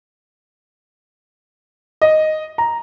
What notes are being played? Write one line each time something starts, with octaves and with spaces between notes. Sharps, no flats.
D#5
A#5